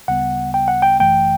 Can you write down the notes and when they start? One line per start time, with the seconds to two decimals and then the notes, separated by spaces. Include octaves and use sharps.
0.08 D2 C#3 G3 B3 F#5
0.54 G5
0.68 F#5
0.82 G5
1.00 G1 F#2 E3 A3 G5